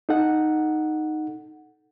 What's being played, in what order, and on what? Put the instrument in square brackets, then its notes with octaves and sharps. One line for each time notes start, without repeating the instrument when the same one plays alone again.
[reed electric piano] D#4 A4 F#5